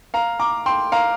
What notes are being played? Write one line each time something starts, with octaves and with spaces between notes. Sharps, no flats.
F5 A#5
A#5 D6
G5 C6
F5 A#5